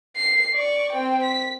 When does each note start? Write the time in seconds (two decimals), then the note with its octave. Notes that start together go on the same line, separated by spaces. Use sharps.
0.16 C7
0.54 D5 C#6
0.93 C4 G5
1.23 B6